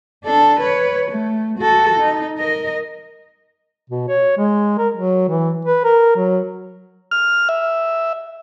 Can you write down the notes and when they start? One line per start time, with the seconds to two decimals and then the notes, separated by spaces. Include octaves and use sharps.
0.24 D4 A4
0.60 B4 C#5
1.11 A3
1.58 F#4 A4
1.99 D#4
2.38 A#4 D#5
3.90 B2
4.08 C#5
4.37 G#3
4.78 A#4
4.94 F#3
5.28 E3
5.65 B4
5.85 A#4
6.16 F#3
7.11 F6
7.49 E5